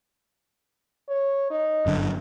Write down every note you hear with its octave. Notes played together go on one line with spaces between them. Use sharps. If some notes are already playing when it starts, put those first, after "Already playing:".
C#5
D#4
G1 F#2 D3